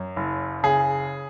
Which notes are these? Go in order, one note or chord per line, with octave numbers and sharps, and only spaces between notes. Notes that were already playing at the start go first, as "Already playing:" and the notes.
Already playing: F#2
F#1
C#3 G#4